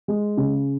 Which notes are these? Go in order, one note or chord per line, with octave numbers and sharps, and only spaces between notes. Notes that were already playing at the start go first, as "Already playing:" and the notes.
G#3
C#3